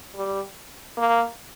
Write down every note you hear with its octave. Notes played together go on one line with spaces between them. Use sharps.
G3
A#3